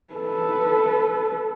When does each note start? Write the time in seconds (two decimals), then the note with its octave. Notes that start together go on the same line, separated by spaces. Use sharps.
0.14 A4 B4